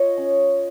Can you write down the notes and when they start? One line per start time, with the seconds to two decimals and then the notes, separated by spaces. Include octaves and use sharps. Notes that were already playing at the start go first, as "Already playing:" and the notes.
Already playing: F4 C#5 D#5
0.17 C#4